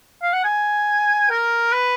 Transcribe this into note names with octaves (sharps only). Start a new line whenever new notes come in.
F5
F#5
G#5
A#4
B4